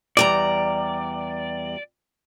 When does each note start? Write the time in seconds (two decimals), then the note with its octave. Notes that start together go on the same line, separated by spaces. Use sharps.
0.17 E2 G3 D5 A#5